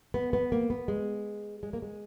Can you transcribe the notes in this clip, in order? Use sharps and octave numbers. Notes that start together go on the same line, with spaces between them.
B3
B3
A#3
B3
G#3
G#3
A#3
G#3